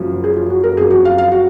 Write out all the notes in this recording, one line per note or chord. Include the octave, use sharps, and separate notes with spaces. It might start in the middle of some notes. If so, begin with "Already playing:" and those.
Already playing: F#1 F#2 F3
G#4
F4
F#4
A#4
F#2 F3 C4 G#4
F#4
F5
F5
F#4